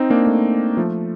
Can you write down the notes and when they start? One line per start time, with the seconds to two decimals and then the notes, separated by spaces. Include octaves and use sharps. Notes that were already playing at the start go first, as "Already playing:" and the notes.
Already playing: C4 D#4
0.10 A#3 D4
0.27 A3 C4
0.77 F3 A3